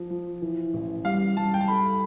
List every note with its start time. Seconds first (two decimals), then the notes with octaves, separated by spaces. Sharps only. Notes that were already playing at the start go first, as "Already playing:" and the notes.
Already playing: F3
0.10 F3
0.42 E3
0.73 A1
1.05 G3 F5
1.37 G3 A5
1.54 G5
1.61 A5
1.68 A4 B5